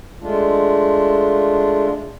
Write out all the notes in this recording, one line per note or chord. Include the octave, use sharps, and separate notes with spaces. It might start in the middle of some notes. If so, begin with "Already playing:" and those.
G#3 A3 D4 F4